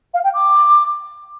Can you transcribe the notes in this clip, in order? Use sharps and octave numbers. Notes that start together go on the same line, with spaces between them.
F5
G5
D6